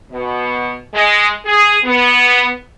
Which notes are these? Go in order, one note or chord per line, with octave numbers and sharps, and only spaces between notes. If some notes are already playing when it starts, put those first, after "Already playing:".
B2
G#3
G#4
B3